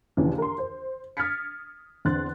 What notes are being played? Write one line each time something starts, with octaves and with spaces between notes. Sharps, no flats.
A#1 D#2 C#3 E3
A#4 C6
C5
D#6 F6 G#6 A6 B6 C#7
E2 D3 C4 C6 F#6 A6